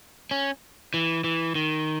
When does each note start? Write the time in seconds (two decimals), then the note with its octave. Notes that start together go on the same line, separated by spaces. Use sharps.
0.31 C#4
0.94 E3
1.24 E3
1.55 D#3